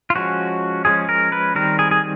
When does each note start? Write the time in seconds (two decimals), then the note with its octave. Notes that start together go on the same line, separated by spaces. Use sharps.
0.10 F4
0.15 F3 G#3 C#4 F#4
0.85 F3 G#3 C#4 G#4
1.09 A#4
1.32 B4
1.55 D#3 G3 C4 A#4
1.79 G#4
1.91 G#4